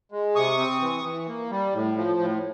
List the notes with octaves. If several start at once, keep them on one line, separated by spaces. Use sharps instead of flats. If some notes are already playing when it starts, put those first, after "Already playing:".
G#3
C3 C#6 D#6
C4
E3
E3
A#3
G3
A2
F3
A2